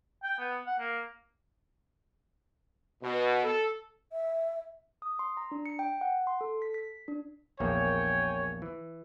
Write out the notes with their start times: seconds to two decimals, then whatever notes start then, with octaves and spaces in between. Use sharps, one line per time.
0.24 G5
0.39 B3
0.66 F#5
0.79 A#3
3.03 B2
3.44 A4
4.12 E5
5.02 D#6
5.19 C6
5.37 A#5
5.51 D4
5.66 C#7
5.79 G5
6.01 F#5
6.27 C6
6.41 A4
6.62 B6
6.74 B6
7.08 D4
7.60 A#1 E2 A#3 C#5 G5 G#5
8.62 E3